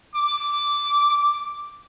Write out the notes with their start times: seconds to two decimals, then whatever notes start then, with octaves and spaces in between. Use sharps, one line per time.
0.15 D6